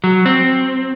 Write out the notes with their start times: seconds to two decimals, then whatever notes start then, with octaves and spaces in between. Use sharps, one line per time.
0.04 F#3
0.26 C4